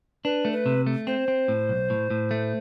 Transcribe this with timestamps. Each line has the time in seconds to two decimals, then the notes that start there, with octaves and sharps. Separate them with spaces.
0.25 D4 B4
0.45 A3
0.52 B4
0.66 C3
0.87 A3
1.07 C4 C5
1.28 C4
1.48 A2
1.69 B1
1.90 A2
2.11 A2
2.31 A3